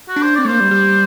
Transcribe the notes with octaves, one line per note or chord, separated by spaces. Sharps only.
F#4
D4
C5
C4 D5
A3
A#3 C5
G3
G3